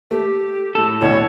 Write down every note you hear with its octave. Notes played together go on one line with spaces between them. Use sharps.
A3 G4
A2 A4
D2 B2 E3 C#5